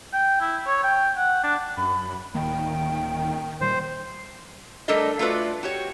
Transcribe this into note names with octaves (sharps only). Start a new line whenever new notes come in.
G5
E4
C#5
G5
F#5
D4
F#2 B5
D1 D#3 A#3 G5
A#2 D#3 G3 C5
G3 A3 D4 A4 A#4 D#5
A3 F4 F#4 B4 D5
F#4 G4 C#5